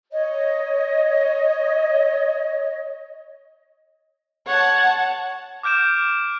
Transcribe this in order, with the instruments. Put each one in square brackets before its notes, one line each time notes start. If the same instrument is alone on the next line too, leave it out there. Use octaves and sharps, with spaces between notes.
[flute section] C#5 D#5
[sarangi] C#5 [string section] F#5 A5
[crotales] D6 F6 G6 D7 E7